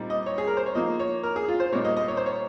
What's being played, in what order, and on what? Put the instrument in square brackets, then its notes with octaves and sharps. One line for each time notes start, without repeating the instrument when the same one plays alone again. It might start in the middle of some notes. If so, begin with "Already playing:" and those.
Already playing: [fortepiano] A#2 G3 C4 D#4
D#5
C#5
G#4
A#4
C5
C#5
F3 A#3 D#4 D#5
C#5
A#4
G#4
F4
C5
A#2 G3 A#3 D#4 C#5
D#5
D#5
C#5
C5
C#5